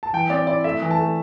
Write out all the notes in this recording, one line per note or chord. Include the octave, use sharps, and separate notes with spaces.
A5
E3 G5
C4 D5
E4 D5
A3 E5
E3
A5
A3